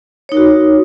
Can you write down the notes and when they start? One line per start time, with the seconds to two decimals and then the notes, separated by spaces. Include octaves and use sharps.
0.29 C#5
0.32 D#4
0.34 A#4
0.37 F#4